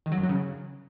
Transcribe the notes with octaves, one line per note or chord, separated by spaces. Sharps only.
D#3
F#3
F#2
F#3
C#3